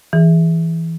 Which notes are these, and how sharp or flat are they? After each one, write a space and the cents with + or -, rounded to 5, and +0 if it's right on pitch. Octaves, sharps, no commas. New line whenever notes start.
E3 -5 G#4 -10